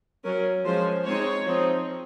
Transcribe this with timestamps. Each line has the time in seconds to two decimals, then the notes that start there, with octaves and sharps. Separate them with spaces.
0.24 F#3 C#4 A#4
0.65 F3 G#3 C#4 C5
1.06 G#3 C4 D#4 C#5
1.46 F3 C4 D#4